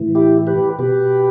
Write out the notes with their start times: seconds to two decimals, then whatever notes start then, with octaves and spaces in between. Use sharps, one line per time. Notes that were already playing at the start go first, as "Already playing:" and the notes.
Already playing: A2 E3
0.15 E4 G4
0.47 G4 B4
0.79 B2 G4 B4